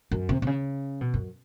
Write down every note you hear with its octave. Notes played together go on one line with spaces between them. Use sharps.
F#2
C3
C3
C#3
B2
F#2